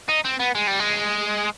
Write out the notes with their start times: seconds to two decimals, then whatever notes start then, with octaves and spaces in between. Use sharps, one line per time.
0.08 D#4
0.25 C4
0.39 B3
0.55 G#3
0.67 G3
0.80 G#3